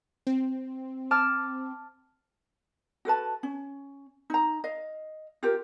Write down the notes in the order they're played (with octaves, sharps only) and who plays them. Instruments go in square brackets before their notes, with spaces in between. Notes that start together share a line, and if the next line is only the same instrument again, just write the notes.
[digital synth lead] C4
[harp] A5 D6 F6
[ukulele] F#4 A4 B4 A5
C#4
D#4 A#5
D#5 F5
F4 G4 A#4